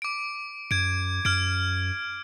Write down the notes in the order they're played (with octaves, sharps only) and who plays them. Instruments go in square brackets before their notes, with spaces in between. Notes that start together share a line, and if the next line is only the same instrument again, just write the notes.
[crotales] D6 D7
[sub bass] F#2 [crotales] G#6 D7
[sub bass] F#2 [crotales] F6 G#6 D7